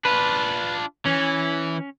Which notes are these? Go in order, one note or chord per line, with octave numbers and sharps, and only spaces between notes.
D4 F4 B4
E3 C#4